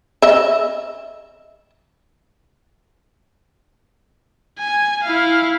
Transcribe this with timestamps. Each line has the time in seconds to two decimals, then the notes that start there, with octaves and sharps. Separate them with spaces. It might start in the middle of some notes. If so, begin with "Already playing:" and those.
0.22 D#5 E5
4.59 G#5
5.03 E4 F5